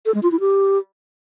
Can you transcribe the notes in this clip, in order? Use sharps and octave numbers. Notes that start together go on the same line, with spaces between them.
A4
G#3
F4
E4
G4